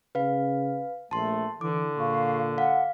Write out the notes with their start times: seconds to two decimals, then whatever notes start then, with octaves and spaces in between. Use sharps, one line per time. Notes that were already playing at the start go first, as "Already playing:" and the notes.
0.15 C#3 B4 F5
1.11 A#1 A3 A5 C6
1.61 D3 E3 D6
1.97 A#2 G#4 F5 C#6
2.58 F5 F#5